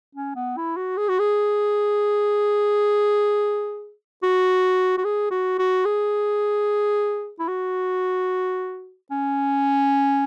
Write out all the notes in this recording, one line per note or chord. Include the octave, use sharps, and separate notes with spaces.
C#4
B3
E4
F#4
G#4
F#4
G#4
F#4
F#4
G#4
F#4
F#4
G#4
E4
F#4
C#4